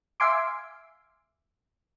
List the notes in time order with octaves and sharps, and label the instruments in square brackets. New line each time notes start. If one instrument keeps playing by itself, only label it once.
[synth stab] E5 F5 G#5 C6 D6